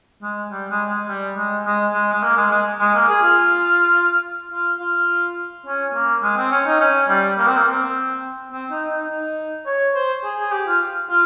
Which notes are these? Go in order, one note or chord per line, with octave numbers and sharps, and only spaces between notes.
G#3
G3
G#3
G#3
G3
G#3
G#3
G#3
G#3
A#3
G#3
G#3
G#3
A#3
G#4
F4
F4
F4
C#4
A#3
G#3
C4
C#4
D#4
C#4
G3
A#3
C4
A#3
C4
C4
D#4
D#4
D#4
C#5
C5
G#4
G#4
G4
F4
F4